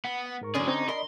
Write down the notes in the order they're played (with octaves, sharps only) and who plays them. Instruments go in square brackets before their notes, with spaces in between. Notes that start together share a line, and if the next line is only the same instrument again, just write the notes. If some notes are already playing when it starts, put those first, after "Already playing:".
[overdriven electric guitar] B3 [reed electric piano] F#5
[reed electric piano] F#5
G#2 A#4 C#6
[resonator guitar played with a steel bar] D3 C#4 [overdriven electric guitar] F#3 G#4
[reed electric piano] C4 D4 C#6 [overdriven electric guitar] D#4
[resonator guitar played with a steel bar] A#4 [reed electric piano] D5 D#5 B5 [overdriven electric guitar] C6